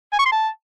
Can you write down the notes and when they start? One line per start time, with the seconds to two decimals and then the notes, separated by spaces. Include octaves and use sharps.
0.13 G#5
0.19 C#6
0.26 C6
0.32 A5